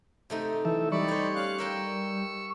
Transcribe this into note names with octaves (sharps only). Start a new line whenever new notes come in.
C3 A3 D#4
E3 A4 E5
G3 D#4 D5 B5 C#6
C5 C#5
C#4 F5 F#6
G4 A#4 G5 E6